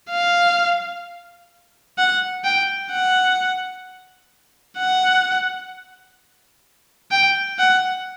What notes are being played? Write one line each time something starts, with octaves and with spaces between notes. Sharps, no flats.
F5
F#5
G5
F#5
F#5
G5
F#5